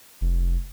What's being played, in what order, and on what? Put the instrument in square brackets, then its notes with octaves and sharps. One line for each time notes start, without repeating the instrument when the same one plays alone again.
[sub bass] F1